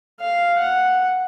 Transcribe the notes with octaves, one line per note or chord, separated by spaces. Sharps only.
F5
F#5